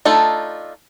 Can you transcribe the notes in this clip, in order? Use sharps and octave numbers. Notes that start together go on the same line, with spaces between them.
A3 D4 D#4 F4 A4